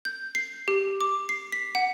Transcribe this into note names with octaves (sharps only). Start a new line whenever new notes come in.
G6
C7
G4
D6
C7
B6
F#5